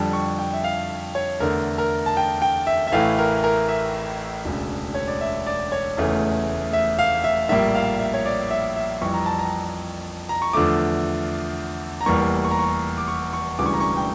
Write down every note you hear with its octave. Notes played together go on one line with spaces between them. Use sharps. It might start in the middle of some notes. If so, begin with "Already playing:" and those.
Already playing: F2 D3 G3 A5
C#6
G5
E5
F5
C#5
E2 D3 A3 A#4
A#4
A5
G5
G5
E5
E5
A1 A2 E3 A3 F5
A#4
A#4
E5
E1 D2 C#3
C#5
D5
E5
D5
C#5
F1 E2 C#3 E3 A3
E5
F5
E5
A#1 A2 G3 A#3 E5
F5
E5
C#5
D5
E5
E5
F2 E3 G3 C#6
A#5
A5
A#5
A#5
C#6
E2 D3 F3 A3 D6
A#5
F1 E2 E3 G3 A#3 C#6
C#6
A#5
C#6
D6
C#6
C#6
E1 D2 C#3 E3 G3 D6
C#6
A#5
C#6
G5